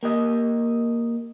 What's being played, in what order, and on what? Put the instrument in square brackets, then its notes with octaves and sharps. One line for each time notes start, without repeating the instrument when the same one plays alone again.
[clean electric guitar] A#3 G4 D#5